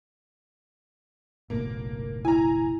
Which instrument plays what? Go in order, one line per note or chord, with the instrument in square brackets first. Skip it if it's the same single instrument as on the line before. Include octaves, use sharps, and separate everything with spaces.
[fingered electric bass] F#1 B1 A2 [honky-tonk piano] A#3
[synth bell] E4 [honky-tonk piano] G#5 A#5